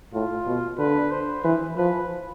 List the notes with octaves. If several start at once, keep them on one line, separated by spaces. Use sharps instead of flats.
A2 F4
B2
D3 B4
C5
E3 B4
F3 B4